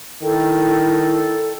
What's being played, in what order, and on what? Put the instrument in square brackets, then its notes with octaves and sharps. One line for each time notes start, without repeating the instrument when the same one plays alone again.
[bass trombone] D#3 [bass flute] E4 [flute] A4